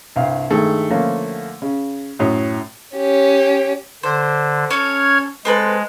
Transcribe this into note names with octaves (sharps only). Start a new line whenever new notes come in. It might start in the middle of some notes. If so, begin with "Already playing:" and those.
C2 G2 F5
G2 D#3 G#3 A3
D3 F3 A3 A#3 C#4
C#3
F#2 A2 D#6
C#4 G4
D3 C5
C#4 A4 C#5 F6 G#6
G#3 C4 A4 B4